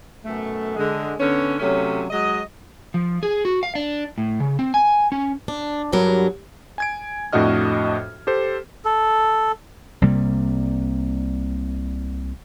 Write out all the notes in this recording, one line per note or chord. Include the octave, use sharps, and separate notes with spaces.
F#2 B2 A3
D3 G#3
D3 B3 C#4
C3 F#3 A3 C#4
F#3 G#3 D#5
F3
G#4
F#4
F5
D4
A2
C#3
C4
G#5
C#4
D4
E2 G2 F#3 A#4
G#5 G#6 D7
F2 A2 D4 F#4 D#5 F6
G4 A4 C5
A4
C2 C3 G3 A#3